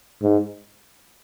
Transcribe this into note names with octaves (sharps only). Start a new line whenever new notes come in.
G#2